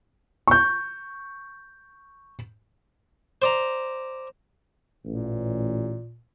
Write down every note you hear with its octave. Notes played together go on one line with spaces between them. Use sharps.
C#6 G6
C5 D5 A#5
A1 A#2